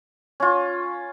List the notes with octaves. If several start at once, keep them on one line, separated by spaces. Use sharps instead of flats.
C#4 F4